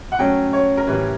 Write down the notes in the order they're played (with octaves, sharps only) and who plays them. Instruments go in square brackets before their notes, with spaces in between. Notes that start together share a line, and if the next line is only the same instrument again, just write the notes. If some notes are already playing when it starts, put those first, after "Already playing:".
[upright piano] F#5
[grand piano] F#3 A3 C#4 [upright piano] G5
[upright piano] C#5
A#4
[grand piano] A2 E3 G3 [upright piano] B4